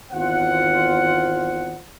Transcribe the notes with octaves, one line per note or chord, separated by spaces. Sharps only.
G#1 E2 B3 F4 C5 F#5